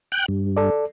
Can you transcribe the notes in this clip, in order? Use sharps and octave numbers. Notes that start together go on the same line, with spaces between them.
G5 F#6
G2
A4 D5